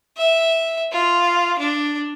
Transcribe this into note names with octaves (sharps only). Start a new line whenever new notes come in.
E5
F4
D4